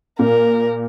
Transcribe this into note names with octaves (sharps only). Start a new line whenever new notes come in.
A#2 A#4